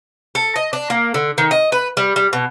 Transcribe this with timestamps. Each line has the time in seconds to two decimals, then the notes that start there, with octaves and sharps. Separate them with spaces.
0.35 A4
0.56 D#5
0.73 D4
0.90 A#3
1.14 D3
1.38 D#3
1.51 D#5
1.72 B4
1.97 G3
2.16 G3
2.33 B2